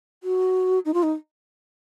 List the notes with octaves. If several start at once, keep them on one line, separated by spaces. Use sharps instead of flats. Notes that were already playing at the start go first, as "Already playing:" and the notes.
F#4
D#4
F4
D#4